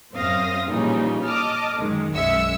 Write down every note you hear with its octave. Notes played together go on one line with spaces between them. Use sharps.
F#2 C4 C5 F5 D#6 A#6
A#2 C#3 E3 F3 G3 D#4
D#5 A5 D6 D#6 F6
F#2 D#3 G#3
B1 F#2 G#3 E5 E6 C#7